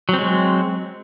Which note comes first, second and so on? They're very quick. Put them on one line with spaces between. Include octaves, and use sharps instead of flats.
F#3 C4 G#3